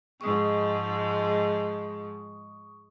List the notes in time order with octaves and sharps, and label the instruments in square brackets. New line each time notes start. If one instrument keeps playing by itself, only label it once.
[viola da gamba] G#2 F3 G#3 [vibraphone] C#6 D#6